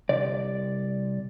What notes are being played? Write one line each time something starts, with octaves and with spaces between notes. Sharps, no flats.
C2 D5